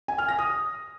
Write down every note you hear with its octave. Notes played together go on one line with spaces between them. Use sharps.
G#5
F6
A#6
D#6